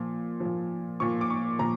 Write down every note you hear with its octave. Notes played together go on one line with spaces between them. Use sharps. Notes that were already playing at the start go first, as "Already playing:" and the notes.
Already playing: A#2 F3
A#2 F3
A#2 F3 C#6
D6
C#6
A#2 F3 A#5